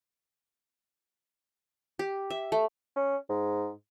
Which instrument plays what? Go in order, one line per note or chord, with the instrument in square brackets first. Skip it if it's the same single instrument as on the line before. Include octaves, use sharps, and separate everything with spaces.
[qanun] G4
E5
A3
[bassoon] C#4
G#2